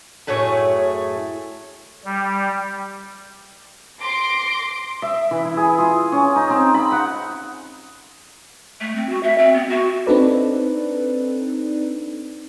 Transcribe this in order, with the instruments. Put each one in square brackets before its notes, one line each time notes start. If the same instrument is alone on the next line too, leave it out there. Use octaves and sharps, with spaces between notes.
[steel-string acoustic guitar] F#2 A2 A3 G#4 C#5
[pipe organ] G3
[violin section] C6 D6 A#6 C7 D7
[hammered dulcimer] E5
E3
E4
G#4
F4
C#4
D#4
C4
B5
F#5
[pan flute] A3
C4
F#4
E5
C4
B3
F#4
[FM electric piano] C4 D4 D#4 A4 B4 D5